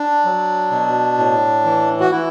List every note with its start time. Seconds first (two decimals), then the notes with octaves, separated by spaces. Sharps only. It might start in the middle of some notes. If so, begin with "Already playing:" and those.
Already playing: D4
0.25 F#3
0.71 B2
1.18 A2
1.65 E3
2.00 F#4
2.11 E3 E4